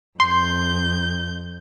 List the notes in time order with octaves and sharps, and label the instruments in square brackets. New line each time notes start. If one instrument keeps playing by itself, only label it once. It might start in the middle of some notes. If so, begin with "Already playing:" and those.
[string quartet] F2 G6 [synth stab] C6